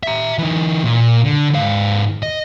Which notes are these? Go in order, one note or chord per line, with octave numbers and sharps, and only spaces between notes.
E5 A#5
E3 D#4
A#2
D3
G#2 F5
D#5